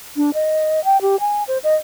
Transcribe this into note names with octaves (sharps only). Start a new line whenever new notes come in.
D4
D#5
G5
G4
G#5
C5
D#5